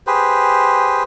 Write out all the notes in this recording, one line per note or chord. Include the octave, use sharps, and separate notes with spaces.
G4 G#4 B4 C5